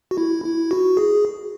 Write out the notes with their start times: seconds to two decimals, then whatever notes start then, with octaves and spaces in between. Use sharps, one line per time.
0.11 F#4
0.18 E4
0.44 E4
0.71 F#4
0.97 G#4